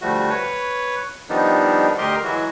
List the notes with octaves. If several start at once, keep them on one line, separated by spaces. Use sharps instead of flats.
D2 F3 G3 A3 F#4
B4 C#5
D#3 F3 G3 B3 D4 D#4
D2 G4 A#4 D#5 C6
E3 F#3 G#3 F#4